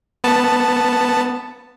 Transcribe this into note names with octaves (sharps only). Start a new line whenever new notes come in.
B3 A5